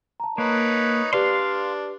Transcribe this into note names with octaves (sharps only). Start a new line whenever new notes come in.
A5 A#5
A#3 D#4 B4 C#5
D4 G4 B4 D5 F5 C6